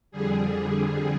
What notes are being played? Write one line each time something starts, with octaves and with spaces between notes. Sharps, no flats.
F2 D3 G3 G#4